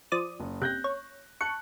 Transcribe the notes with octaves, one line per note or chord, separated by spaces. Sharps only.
F3 D5 D#6
F#1
C3 F#6 G6 A#6
C#5
A5 C#6 F#6 C#7